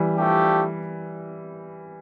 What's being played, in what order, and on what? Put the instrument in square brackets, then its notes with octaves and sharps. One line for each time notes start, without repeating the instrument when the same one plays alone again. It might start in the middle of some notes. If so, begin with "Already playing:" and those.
Already playing: [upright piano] E3 G3
[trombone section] F3 A3 D4 G4